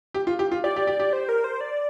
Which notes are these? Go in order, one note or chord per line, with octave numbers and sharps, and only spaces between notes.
G4
F4
G4
F4
G4 D5
G4
G4
G4
C5
A#4
C5
D5